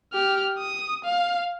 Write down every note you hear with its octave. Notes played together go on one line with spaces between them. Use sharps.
G4 F6
D#6
F5